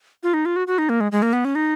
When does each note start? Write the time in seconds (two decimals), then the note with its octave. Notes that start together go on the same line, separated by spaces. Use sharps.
0.23 F4
0.34 D#4
0.45 F4
0.56 F#4
0.67 F#4
0.78 D#4
0.89 A#3
1.00 G#3
1.12 G#3
1.22 A#3
1.33 B3
1.45 C#4
1.55 D#4